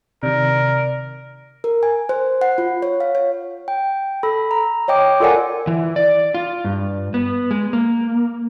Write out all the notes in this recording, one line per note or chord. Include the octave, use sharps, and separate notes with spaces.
C3 D#3 A#4 D5
A#4
G#5
C5
F#5
F4
C#5
F5
C#5
G5
A4 B5
A#5
C#5 D#5 G5 D6
F4 A4 A#4 D5 F#5 G#5
E3
D5
F4
G2
B3
G#3
A#3